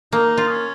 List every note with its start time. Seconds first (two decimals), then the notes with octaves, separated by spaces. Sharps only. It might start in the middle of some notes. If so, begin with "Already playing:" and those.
0.12 A#3 D#4
0.37 F4
0.50 C#4